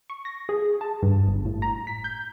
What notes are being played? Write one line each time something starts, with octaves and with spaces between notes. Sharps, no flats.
C#6
A#6
G#4
A5
G2
G1
A2
A#5
B6
G6